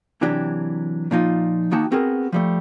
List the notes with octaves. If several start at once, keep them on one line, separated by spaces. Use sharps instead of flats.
C3 E3 F#3 D4 G4
A#2 F3 D#4 F4
D#3 A#3 D#4 F#4 G5 A5
B3 C4 F#4 G#4 A#4
F3 G3 A3